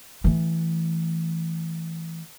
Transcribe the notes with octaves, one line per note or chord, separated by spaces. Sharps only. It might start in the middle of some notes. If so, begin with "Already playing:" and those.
E3 A3